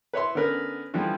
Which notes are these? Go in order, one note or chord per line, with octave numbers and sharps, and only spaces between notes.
B4 C#5 E5 C6
D3 B3 C#4 A#4 B4
D3 E3 F3 G3 B3 E4